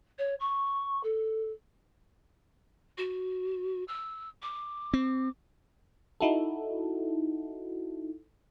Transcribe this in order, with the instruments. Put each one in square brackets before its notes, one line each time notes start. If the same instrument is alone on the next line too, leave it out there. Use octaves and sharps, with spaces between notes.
[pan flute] C#5
C#6
A4
F#4
E6
D6
[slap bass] C4
[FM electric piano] D#4 E4 F#4 A4